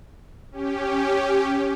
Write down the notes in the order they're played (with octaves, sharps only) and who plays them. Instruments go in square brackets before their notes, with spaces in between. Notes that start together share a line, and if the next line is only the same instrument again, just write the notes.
[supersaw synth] C#4 G4